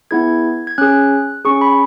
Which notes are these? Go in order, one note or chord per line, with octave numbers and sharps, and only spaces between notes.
B3 E4 G#4 G#6
G#6
C#4 G#4 F#6
C#4 G#4 C#6
B5